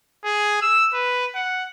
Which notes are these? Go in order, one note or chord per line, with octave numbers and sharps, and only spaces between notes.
G#4
E6
B4
F#5